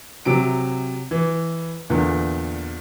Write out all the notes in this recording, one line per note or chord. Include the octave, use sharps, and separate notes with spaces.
C3 F#3 D7
E3
E2 A#2 D3